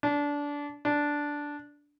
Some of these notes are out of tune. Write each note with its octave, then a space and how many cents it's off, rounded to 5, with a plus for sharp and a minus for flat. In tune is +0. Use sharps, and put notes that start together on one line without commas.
D4 -20
D4 -5